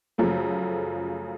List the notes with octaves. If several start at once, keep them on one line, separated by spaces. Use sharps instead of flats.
F#2 C#3 F3 A3